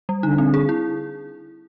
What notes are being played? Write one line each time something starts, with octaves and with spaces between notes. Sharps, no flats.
G3
D3 D#4
C4
G#4
E4